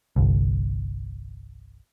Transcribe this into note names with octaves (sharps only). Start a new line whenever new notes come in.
G1 C2